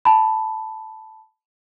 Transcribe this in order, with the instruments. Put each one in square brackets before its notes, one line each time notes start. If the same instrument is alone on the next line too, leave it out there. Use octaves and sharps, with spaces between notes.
[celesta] A5 B5